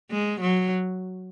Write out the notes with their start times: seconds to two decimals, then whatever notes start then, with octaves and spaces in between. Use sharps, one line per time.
0.12 G#3
0.41 F#3